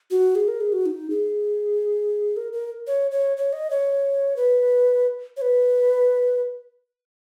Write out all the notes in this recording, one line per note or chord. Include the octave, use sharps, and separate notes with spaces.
F#4
G#4
A#4
G#4
F#4
D#4
G#4
A#4
A#4
C#5
C#5
C#5
D#5
C#5
B4
C#5
B4